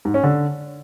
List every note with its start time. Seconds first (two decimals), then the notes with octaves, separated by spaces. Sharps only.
0.05 G#2
0.14 C#4
0.23 D3